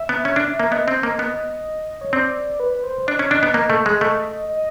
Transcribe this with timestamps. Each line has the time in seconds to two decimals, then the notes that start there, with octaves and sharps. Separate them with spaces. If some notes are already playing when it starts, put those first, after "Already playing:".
Already playing: E5
0.09 B3
0.25 C#4
0.36 D4
0.60 A#3
0.72 B3 D#5
0.88 C4
1.03 A#3 D#5
1.19 B3
2.01 C#5
2.13 C4 D5
2.60 B4
2.83 C5
3.07 D4 D#5
3.19 C#4
3.31 D4 D#5
3.43 B3
3.54 A#3 D#5
3.70 A3
3.86 G#3
4.01 A3
4.49 D#5